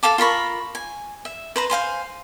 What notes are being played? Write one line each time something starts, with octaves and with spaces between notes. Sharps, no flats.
A4 F5 A5 D6
F4 A#4 B5 C#6
G#5
E5
B4 C5 A#5
C5 F5 G#5 C6